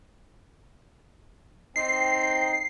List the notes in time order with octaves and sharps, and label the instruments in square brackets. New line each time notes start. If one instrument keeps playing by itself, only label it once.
[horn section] C4 D#4 G5 [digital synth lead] C7